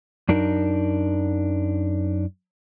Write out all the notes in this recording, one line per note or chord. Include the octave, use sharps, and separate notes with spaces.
F#2 D4 D#4 A#4